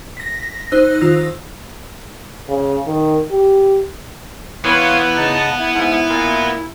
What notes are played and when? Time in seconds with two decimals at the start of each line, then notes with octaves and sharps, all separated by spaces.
0.17 A#6 B6
0.72 D#4 C5 E6 F#6
1.01 D#3 F4 E6 A#6
2.49 C#3
2.87 D#3
3.31 G4
4.64 E3 B3 C#5 F5 C6
5.16 C#3 D#4 A5
5.58 E4
5.75 G#2
6.10 A#2